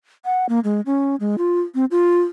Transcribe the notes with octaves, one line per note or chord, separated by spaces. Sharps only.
F#5
A#3
G#3
C#4
G#3
F4
C4
F4